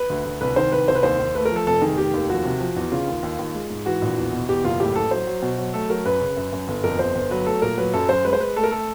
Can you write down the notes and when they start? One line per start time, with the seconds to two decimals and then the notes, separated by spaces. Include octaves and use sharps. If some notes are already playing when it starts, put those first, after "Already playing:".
Already playing: B4
0.10 D2
0.25 D2
0.41 C2 B4
0.56 D#3 C5
0.72 C2 B4
0.88 C2 C5
0.95 B4
1.03 D#2 C5
1.19 D#2
1.35 A3 B4
1.45 A#4
1.51 F3
1.56 A4
1.67 F1 A4
1.82 D#3 G#4
1.98 F1 G4
2.14 D#2
2.29 F3 F#4
2.45 C3
2.60 F3
2.76 E2
2.92 C#3 F4
3.07 D#2
3.23 D#2
3.39 D#2
3.54 G#3
3.70 G#2
3.86 E3 F#4
4.02 A#1
4.18 E2
4.33 B2
4.49 E2 G4
4.64 F#1 F4
4.80 A2 G4
4.95 A1 A4
5.11 F#3 C5
5.27 F#3
5.42 B2
5.58 F#3
5.73 A3 A4
5.90 F#3 A#4
6.05 F#2 B4
6.21 C#3
6.37 F#2
6.52 F#2
6.68 G1
6.84 F2 A#4
6.99 G1 C5
7.15 G1
7.31 F#3 B4
7.46 A3 A4
7.62 A#2 A#4
7.78 F#3 B4
7.94 F#2 A4
8.09 F#2 C5
8.25 G#3 B4
8.33 C5
8.40 G#3 B4
8.56 A3 A4
8.63 A#4
8.71 A3 A4